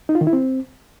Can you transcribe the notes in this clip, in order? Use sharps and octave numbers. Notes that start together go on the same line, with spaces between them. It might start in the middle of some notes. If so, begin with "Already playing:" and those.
D#4
F4
D#3
E4
C4